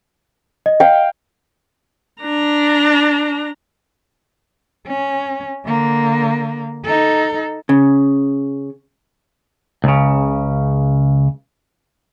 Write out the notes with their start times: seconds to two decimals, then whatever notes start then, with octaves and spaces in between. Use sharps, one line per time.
0.66 D#5
0.80 F5 G5
2.23 D4 A#5
4.87 C#4
5.66 D3 A#3
6.85 D#4 A4
7.69 C#3
9.84 C#2 C#3